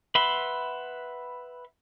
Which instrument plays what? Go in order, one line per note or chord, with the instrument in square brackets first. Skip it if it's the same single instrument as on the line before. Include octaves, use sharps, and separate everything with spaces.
[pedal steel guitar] B4 E5 F#5 B5 C6